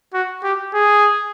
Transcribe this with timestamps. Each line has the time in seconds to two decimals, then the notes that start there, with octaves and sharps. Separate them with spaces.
0.14 F#4
0.43 G4
0.74 G#4